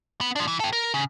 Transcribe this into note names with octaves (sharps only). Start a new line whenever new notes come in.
B3 B4
F3 D4
E3
A4 G5
A#4
C#3